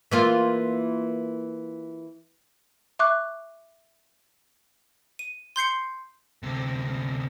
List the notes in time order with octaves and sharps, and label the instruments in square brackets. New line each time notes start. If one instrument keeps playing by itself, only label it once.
[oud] E3 A#3 F4
[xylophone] E5 C#6 D6 F#6
D#7
C6 G6 C7 C#7
[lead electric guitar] D2 C3